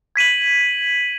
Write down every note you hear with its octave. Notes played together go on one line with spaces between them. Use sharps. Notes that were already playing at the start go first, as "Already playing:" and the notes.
G#6 B6 D#7 F#7